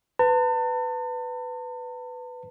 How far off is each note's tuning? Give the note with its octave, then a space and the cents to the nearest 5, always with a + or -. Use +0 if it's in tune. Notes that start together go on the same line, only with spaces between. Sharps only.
B4 +15 A5 +40